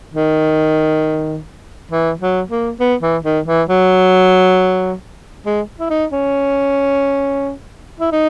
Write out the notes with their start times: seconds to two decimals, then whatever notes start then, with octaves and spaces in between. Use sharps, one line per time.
0.14 D#3
1.92 E3
2.21 F#3
2.50 A#3
2.80 B3
3.02 E3
3.24 D#3
3.47 E3
3.69 F#3
5.46 G#3
5.80 E4
5.90 D#4
6.12 C#4
8.00 E4
8.12 D#4